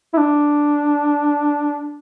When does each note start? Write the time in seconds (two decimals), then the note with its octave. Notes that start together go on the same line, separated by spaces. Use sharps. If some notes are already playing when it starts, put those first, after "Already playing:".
0.13 E4
0.17 D4